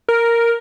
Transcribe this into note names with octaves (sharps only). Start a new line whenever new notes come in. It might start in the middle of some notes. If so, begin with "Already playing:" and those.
A#4